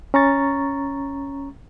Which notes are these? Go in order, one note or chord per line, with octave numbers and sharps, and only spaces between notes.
C#4 A#5 C#6 A6